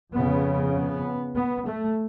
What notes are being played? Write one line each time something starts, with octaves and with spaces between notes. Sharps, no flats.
F2 C#3 B3
B3
B3
A3